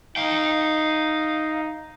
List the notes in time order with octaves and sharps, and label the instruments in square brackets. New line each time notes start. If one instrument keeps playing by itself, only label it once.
[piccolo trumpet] D#4 [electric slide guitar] F5 G5